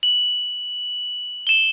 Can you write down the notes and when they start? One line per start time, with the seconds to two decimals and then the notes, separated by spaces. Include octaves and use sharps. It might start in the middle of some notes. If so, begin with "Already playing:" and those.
0.03 F#7
1.47 E7 G7